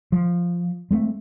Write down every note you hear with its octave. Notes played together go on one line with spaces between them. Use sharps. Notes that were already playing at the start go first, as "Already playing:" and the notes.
F3
G#3 A3 B3 C4